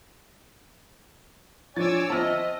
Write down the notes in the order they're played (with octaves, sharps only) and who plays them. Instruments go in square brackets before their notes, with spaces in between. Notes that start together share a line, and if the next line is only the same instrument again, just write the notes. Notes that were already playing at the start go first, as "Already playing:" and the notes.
[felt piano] F3 D4 [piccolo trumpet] C#5 [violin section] G#5 D6 E6 [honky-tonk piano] A6
[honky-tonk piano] F3 C4 [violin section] D#5 [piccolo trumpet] E5 [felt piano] A5 F6